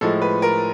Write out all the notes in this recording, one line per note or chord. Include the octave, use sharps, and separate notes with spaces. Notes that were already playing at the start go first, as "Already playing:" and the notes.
A2 F3 G#3 A4
B4
A#4